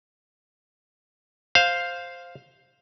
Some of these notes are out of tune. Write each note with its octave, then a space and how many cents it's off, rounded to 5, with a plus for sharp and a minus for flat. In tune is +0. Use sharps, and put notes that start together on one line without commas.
C5 +0 F5 +0